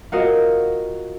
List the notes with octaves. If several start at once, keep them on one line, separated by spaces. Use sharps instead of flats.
F4 F#4 A#4 D#5